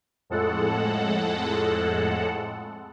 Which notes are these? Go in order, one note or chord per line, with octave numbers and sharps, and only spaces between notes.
F2 A2 G#3 A4 F#5